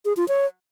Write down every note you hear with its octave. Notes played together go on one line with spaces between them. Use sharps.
G#4
F4
C#5